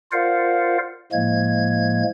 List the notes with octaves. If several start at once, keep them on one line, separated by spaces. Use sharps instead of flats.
F4 A#4 C5 D5 F5 F#5
A2 F3 G#3 A#3 G#6